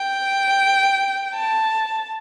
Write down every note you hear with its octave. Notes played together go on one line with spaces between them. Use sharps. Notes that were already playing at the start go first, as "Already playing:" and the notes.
Already playing: G5
A5